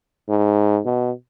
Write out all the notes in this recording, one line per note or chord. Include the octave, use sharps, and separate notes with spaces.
G#2
B2